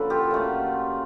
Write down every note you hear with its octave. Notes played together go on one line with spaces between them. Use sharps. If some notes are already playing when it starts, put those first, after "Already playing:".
Already playing: D3 F3 A#3 C#4 A4 B4
F4 G4
A#2 F#3 A3 C#4